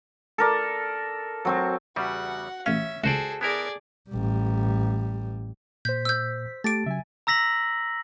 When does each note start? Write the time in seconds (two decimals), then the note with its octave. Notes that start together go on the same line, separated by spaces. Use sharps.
0.38 A4 A#4 D5
1.45 F#3 C4 C#6
1.96 E2 C#3 G3 F#4 F#5
2.66 A1 C#4 E5 F5
3.04 C#2 F#4 G#4 A4 C5 D5
3.41 B3 E4 G#4 A#4 D5
4.10 A1 G3
5.85 A#2 C5 G6 B6
6.05 E6 G6
6.64 A3 G4 A5 A6 D7
6.86 C#3 F#3 E5 G#5
7.27 A#5 E6 A#6 B6 F#7